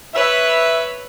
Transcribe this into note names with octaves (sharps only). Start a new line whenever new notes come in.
B4 C#5 E5